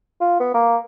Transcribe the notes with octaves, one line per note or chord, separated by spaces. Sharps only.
F4
B3
A#3